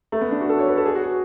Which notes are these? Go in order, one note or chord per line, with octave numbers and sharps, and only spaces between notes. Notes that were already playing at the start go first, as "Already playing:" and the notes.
A3
B3
D4
F#4
A4
C#5
B4
A4
G#4
F#4
G#4